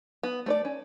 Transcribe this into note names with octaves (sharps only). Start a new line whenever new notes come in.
B3
A3 C#5 D5
C#4